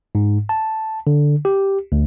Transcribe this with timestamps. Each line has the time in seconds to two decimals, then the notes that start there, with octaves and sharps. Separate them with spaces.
0.15 G#2
0.49 A5
1.07 D3
1.45 G4
1.92 D2